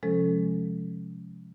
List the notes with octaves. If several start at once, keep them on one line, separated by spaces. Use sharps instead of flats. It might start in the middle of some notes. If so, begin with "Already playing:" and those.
C3 F3 G#3 C#4 A4